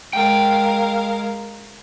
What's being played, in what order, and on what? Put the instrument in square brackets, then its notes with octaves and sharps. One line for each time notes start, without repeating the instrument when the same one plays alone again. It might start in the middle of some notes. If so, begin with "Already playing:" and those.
[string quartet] G#3 A#4 F5 [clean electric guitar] G5